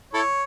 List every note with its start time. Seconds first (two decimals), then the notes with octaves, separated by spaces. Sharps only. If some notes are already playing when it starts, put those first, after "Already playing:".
0.14 E4 A4 C#5